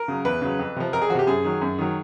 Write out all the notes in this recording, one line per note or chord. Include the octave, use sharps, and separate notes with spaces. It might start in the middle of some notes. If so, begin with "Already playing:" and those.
Already playing: A#4
C#3 F#3
E2 B4
C#3 F#3
F2
C3 F3
F2 A#4
G#4
F3 F#4
C3 G4
F#2 G#4
D#3 F#3
F#2
D#3 F#3